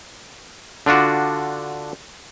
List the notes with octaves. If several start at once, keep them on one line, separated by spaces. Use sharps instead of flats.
D3 D4 F4 F#4